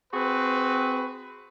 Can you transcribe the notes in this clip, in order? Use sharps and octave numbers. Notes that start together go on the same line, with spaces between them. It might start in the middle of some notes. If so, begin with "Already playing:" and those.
C4 F#4 G#4 B4